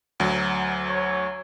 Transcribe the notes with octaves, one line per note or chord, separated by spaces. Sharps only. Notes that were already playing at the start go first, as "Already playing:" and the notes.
D2 F#3
C#5